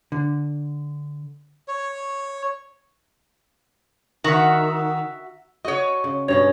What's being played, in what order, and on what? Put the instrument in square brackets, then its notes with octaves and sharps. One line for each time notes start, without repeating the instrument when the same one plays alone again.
[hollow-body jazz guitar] D3
[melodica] C#5
[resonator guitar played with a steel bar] D#3 [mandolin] F#4 E5
[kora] F#4 [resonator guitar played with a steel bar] C#5 D#5
[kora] C#3
[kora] G2 B2 C#4 [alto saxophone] C#5